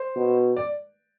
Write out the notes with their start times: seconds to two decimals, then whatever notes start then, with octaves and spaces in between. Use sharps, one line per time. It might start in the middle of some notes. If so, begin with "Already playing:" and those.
Already playing: C5
0.16 B2
0.57 D5